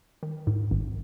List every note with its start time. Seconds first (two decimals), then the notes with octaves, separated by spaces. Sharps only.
0.23 D#3
0.47 G#2
0.71 G#1